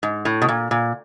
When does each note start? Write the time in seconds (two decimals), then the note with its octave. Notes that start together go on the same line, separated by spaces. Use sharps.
0.03 G#2
0.25 A2
0.42 B2
0.49 A#2
0.71 A#2